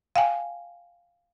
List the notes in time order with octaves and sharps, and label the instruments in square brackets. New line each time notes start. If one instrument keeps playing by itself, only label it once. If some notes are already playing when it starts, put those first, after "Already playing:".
[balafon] F5 G5 G#5